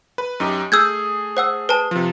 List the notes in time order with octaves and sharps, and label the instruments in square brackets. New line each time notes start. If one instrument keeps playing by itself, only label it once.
[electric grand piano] B4
F#2 D#4 G4
[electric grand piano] A3 G#4 [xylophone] E6 G6 G#6
[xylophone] C5 F#5 E6
B4 G#5 A5
[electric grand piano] C3 F3